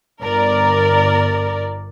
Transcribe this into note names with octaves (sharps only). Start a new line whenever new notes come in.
G1 A#4 D5